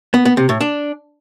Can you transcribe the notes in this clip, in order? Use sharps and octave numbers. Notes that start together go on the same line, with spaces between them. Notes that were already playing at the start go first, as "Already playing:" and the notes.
B3
B3
C3
A2
D4